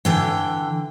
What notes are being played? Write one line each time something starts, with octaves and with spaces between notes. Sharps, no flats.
D3 E3 G5